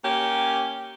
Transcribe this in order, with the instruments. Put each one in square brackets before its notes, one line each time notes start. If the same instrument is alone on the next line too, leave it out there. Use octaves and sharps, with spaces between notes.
[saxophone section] A#3 C#4 G4